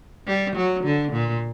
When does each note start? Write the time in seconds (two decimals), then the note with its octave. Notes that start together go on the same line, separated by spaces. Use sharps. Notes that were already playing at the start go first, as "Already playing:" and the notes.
0.27 G3
0.56 F#3
0.84 D3
1.13 A#2